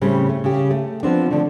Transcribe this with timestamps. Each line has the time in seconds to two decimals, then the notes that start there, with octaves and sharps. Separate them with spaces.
0.01 A2 C#3 G3 A3 C4
0.29 A3
0.44 C#3 G4
0.71 A3
1.03 F3 B3 C4 D4
1.30 D3 F3 A3 D4